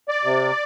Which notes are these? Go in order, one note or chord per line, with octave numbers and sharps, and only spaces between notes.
D5
C3